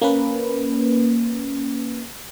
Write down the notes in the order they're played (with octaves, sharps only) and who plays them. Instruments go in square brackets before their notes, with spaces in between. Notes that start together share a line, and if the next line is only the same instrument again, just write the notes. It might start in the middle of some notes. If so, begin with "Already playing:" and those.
[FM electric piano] A#3 C#4 B4